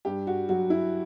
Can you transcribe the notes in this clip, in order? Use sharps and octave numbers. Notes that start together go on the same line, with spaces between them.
G2 G4
F#4
F#3 F#4
E4